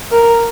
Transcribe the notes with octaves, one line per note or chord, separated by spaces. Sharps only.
A#4